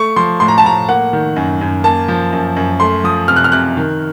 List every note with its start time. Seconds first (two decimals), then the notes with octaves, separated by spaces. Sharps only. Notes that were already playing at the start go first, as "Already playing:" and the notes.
Already playing: A3 C#6
0.16 F3 C6
0.40 A2 C6
0.48 A#5
0.58 A5
0.64 A2 A#5
0.89 A#3 F#5
1.13 D#3
1.36 F#2
1.61 F#2
1.84 A#3 A5
2.08 F3
2.33 F#2
2.56 F#2
2.80 A3 C6
3.04 F3 D#6
3.28 C3 F6
3.36 F#6
3.44 F6
3.52 C3 F#6
3.77 D#3